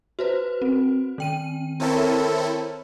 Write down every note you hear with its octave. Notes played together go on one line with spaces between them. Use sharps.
F#4 B4 C5
C4
D#3 G5 D#7
C4 E4 A4 A#4 C#5 A5